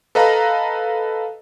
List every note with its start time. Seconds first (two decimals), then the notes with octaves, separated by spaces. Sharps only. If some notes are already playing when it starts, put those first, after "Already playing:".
0.15 A4 B4 D#5 F5 A#5